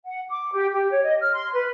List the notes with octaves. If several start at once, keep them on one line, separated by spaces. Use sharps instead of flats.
F#5
D6
G4
G4
C#5
D#5
F6
C6
B4